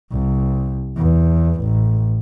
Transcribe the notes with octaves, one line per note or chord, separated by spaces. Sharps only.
C2
E2
A1